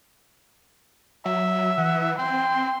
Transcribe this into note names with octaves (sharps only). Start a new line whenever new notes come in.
F#3 E5
E3 F#5
C4 G5 C6